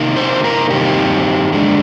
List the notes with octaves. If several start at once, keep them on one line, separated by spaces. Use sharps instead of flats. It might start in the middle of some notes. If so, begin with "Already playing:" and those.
Already playing: C3 D#3 A#3 D#4
C5
A#4
G2 D#3 G3 C4 D#4 G4
F2 D3 G#3 D4